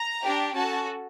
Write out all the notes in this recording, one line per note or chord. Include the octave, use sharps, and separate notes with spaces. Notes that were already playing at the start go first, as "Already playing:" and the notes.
Already playing: A#5
D4 G4
C#4 F#4 A4 A5